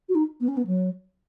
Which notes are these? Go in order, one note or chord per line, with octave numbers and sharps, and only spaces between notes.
F#4
D#4
B3
C#4
B3
F#3